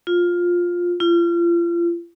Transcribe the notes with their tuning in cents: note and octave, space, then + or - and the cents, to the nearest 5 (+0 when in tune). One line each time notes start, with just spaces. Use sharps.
F4 +10
F4 -35